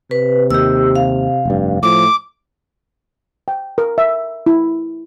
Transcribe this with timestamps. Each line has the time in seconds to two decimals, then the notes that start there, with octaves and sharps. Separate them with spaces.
0.11 C3 B4
0.51 D#2 D#3 G4 E6
0.95 F5
1.45 F1 G2
1.83 A2 F3 D6
3.48 G5
3.78 A#4
3.98 E5
4.46 E4